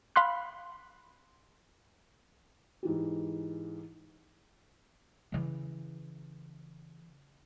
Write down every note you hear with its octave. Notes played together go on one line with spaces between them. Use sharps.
F5 B5 C6 F#6
G#2 E3 G4
C#3 E3